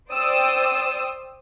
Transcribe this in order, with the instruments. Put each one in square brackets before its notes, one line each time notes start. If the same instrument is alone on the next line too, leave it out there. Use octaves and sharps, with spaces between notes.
[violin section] C5 D5 G5 D#6 E6